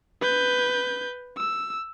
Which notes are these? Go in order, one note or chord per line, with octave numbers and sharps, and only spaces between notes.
B4 G6
E6